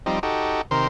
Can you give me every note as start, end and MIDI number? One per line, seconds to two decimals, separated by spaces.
0.06 0.19 53
0.06 0.19 55
0.06 0.19 60
0.06 0.19 63
0.23 0.61 63
0.23 0.61 66
0.23 0.61 67
0.23 0.61 69
0.71 0.87 48
0.71 0.87 51
0.71 0.87 70
0.71 0.87 72
0.71 0.87 84